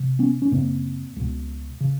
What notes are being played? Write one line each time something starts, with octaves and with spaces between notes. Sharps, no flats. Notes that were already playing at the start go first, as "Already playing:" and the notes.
Already playing: C3
B3 C#4
C#4
F#2 C#3 A#3 C4
C#2 B2
C#3